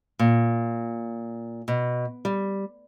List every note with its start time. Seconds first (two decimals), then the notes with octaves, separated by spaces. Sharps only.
0.19 A#2
1.68 B2
2.25 G3